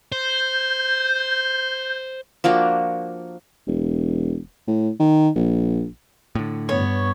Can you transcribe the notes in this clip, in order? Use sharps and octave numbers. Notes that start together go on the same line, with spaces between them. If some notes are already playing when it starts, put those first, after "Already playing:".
C5 G6
F3 A#3 D4 F#4
E1
A2
D#3
A#1
A2 D3
G2 B3 C#5